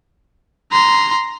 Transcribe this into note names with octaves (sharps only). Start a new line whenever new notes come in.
A#5 C6